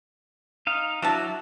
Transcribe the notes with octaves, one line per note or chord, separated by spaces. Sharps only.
D#4 F5
F#3 D4 E4 F#4 E5 A5